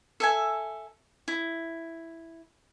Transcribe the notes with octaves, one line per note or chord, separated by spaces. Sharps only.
A4 E5 G#5
E4